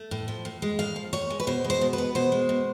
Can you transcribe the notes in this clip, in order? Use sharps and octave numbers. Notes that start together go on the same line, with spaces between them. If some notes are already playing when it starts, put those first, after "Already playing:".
Already playing: A3
A2
F3
A2
G#3
A2 F5
F3
A2 C#5
G#3
B4
B2 C5
G#3
C5
B2
B4
B3
B2 C5
G#3
B2